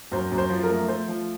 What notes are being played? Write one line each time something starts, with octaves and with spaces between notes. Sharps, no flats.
F#2 C5
F#2
C5
F3
A#4
A3
A3 C5
F3